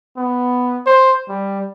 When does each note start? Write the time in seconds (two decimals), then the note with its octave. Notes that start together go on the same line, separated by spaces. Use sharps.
0.17 B3
0.87 C5
1.29 G3